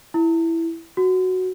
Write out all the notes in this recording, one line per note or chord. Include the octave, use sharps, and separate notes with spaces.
E4
F#4